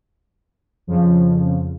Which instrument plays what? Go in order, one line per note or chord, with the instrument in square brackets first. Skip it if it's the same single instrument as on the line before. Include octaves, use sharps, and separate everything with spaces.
[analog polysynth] F2 C#3 F3